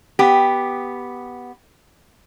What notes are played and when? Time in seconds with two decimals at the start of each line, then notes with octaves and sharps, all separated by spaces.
0.19 B3 G4